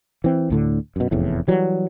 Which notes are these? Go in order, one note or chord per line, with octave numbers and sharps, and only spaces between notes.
E3 C4
D2 A2 D3
F#2 B2
F1 E2 A2
E3 F#3 G3